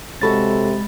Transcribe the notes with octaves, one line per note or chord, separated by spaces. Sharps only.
C3 G#3 F#4 A4 C#5 B5 A6